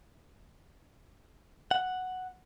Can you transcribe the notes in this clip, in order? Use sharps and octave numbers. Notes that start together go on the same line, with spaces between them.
F#5